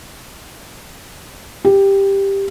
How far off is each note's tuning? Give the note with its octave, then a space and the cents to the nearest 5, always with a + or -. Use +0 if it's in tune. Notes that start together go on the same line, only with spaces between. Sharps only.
G4 +5